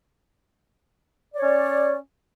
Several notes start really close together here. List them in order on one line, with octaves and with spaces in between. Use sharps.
D5 C#5 C#4